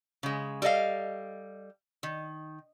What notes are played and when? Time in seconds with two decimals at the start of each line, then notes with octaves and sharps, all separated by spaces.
0.23 C#3 G#3
0.62 G3 A4 D#5 F5
2.03 D#3